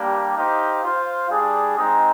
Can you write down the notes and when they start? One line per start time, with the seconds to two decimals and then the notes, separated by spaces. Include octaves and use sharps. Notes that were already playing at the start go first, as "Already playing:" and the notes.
Already playing: G3 A#3 D4 G4
0.36 D#4 G4 C5 F5
0.83 F4 C5 F5
1.29 G3 D4 G#4
1.76 G#3 C4 D#4